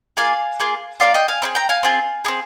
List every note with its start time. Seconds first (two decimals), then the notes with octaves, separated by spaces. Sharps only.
0.17 A#3 F4 G#4 F5 G#5
0.60 A#3 F4 G#4
1.00 A#3 D4 F4 D5 F5
1.14 D#5 G5
1.28 F5 G#5
1.42 C4 D#4 G#4
1.55 G5 A#5
1.69 F5 G#5
1.83 C4 F4 G#4
2.25 C4 D#4 G#4